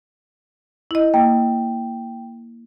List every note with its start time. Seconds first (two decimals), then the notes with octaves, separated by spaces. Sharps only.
0.91 E4 D#5
1.14 A#3 G5